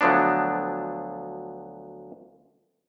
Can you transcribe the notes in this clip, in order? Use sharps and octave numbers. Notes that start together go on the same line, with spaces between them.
D2 F3 F#3 B3 D4